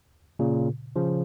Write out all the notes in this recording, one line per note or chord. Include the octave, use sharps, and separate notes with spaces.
A#2 C#3
C#3 F3